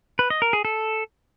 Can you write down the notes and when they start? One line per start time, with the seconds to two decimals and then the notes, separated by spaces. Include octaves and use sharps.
0.19 B4
0.30 D#5
0.42 A#4
0.53 G#4
0.65 A4